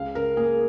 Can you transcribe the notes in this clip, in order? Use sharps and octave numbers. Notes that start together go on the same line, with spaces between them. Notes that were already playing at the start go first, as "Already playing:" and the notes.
Already playing: C#2 F5
C#3 A#4
A#3 G#4